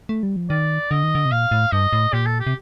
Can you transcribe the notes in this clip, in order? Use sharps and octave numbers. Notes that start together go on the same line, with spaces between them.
A3
G3
F3
D#3 D5
D3 D#5
D#3
D3
C3
A#2 F5
A2
G2 D#5
A2
A#2 G4
A4
G4
C3